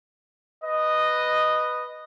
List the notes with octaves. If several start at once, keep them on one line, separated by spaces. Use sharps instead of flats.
B4 D#5